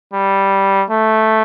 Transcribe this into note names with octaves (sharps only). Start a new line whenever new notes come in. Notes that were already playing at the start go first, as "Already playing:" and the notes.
G3
A3